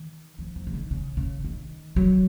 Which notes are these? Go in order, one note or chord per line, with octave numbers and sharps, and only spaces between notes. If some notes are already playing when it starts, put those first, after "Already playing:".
Already playing: D#3
F3
F3
C#3
D#3
C#3
C#3
D#3
F#3